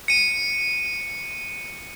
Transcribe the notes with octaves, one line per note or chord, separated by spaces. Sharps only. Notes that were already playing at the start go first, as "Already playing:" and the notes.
C#7 D#7